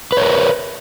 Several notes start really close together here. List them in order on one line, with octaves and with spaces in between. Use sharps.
B4 C#5 A#4